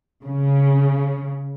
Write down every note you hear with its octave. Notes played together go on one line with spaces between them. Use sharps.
C#3